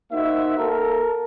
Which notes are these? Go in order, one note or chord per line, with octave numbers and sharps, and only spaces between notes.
A#3 D#4 F#4 C5 E5
A#3 A4 A#4